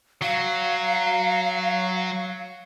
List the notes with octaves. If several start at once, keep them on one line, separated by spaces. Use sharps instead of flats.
F#3 F5